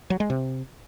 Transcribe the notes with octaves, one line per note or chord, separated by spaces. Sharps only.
F#3
G#3
C3